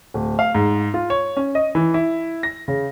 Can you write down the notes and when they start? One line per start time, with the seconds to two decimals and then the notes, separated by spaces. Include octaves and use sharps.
0.14 D1
0.39 F5
0.55 G#2
0.94 F4
1.10 C#5
1.37 C#4
1.55 D#5
1.75 E3
1.94 E4
2.43 A#6
2.68 C#3